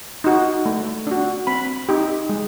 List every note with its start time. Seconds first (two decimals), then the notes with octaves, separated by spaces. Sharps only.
0.24 D#4 F#4
0.66 A3
1.07 D4 F#4
1.47 C4 B5
1.89 D#4 G4
2.29 G#3